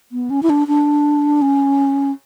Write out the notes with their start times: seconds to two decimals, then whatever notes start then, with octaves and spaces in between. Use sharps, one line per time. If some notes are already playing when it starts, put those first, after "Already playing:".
0.12 B3
0.30 C#4
0.43 E4
0.50 D4
0.68 D4
1.42 C#4